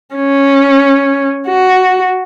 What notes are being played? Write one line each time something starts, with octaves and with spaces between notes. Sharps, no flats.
C#4
F#4